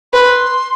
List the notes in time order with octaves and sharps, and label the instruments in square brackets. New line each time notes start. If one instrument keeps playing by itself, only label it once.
[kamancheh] B4 [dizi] C6